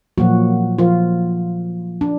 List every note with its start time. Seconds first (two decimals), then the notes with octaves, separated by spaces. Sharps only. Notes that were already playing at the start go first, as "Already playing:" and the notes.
0.18 A#2 F3 F#3 A#3 F#4
0.78 F3 F4
2.01 D4